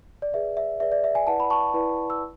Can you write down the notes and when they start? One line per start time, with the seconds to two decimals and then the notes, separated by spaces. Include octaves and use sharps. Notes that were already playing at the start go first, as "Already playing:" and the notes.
0.22 D5
0.33 G#4 B4 D5 E5
0.57 E5
0.80 G#4 B4 D5 E5
0.92 D5
1.04 E5
1.15 E5 G#5
1.27 E4 B4 D5 F#5 A5
1.40 B5
1.50 A5 C#6
1.74 E4 B4 D5
2.10 E6